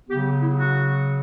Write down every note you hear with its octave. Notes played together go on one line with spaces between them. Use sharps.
C#3 F#3 B3 G4
E4
F#4